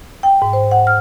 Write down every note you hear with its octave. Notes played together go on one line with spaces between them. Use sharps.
G5
G#2
C5
F#5
F6